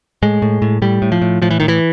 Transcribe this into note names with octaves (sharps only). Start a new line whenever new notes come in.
A2 G#3
A2
A2
A2 G3
A2
F3
A2
A2 F3
E3
A2 D#3
E3